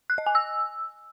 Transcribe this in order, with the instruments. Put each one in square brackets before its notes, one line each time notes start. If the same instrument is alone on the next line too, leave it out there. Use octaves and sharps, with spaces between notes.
[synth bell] F#6
D#5
G#5
E6